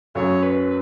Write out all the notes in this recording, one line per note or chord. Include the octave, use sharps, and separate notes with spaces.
F#2 F#3 C#4 A4 C#5
B4